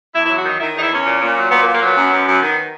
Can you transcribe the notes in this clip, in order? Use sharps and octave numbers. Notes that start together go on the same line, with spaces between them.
E2 E4
E4
F#3
F#4
D#3 D#4
D#3 E4
E2 D#4
E4
E2 C#4
A#2
A#2
F#3
A#2 B3
A#3
A#2
A#3
F#3 B3
F#2
F#2
F#2
D#3